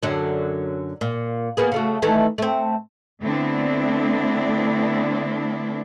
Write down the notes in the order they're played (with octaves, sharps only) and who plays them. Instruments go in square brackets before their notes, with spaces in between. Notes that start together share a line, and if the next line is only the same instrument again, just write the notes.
[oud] F#2 D3 F#3
A#2
A#3 B3 G#4
C#3 A3 F#4
D#3 E3 A3
A3 C4
[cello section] D3 A3 B3 C4 D4 E4